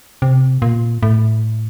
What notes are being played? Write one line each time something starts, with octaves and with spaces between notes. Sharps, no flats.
C3
A#2
A2